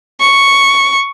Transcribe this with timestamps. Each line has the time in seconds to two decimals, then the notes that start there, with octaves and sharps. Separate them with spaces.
0.20 C#6